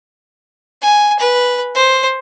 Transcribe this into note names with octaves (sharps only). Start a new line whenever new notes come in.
G#5
B4
C5